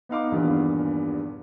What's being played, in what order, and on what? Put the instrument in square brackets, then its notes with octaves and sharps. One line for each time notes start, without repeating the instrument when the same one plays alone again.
[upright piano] B3 D#4 F5 D6
D#1 E2 G2 A#2 B3